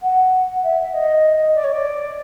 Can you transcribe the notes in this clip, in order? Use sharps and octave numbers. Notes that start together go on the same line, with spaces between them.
F#5
E5
D#5
D5
C#5
D5